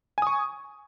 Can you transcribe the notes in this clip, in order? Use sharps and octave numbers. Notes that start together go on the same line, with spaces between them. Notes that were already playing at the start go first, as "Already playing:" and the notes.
G#5 C#6 D#6